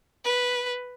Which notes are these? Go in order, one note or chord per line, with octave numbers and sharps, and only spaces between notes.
B4